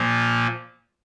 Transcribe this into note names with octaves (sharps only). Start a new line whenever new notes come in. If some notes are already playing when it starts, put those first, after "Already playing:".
Already playing: A#2 F3 A#3